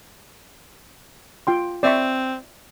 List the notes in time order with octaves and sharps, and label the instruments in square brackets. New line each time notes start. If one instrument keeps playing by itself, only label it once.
[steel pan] F4 G5 C6
[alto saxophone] C4 [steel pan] D5 E5 C#6